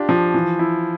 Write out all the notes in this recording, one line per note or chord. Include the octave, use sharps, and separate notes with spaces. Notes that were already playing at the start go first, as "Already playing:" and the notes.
Already playing: D4 F4 G4
F3
E3
E4